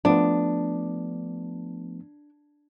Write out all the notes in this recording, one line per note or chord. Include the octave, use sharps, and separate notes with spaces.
F3 A3 B3 D4